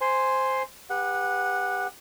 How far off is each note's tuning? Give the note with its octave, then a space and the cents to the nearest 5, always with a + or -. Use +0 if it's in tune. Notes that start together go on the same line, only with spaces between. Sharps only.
C5 +0 G#5 +0 C6 +0
G4 +25 B4 +0 F#5 -10